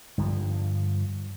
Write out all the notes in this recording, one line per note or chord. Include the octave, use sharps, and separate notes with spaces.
G2 D3 F3